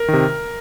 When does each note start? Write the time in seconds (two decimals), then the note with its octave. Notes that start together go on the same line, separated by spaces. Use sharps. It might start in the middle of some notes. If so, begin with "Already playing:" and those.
Already playing: A#4
0.08 C3 D#3